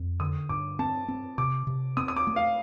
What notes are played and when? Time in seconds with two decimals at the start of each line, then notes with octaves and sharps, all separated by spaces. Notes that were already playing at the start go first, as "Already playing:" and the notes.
Already playing: F2
0.20 D3 D#6
0.49 G2 D6
0.79 C4 A5
1.08 C4
1.38 C3 D6
1.67 C3
1.97 C4 D#6
2.08 D#6
2.16 D6
2.27 A3
2.36 F5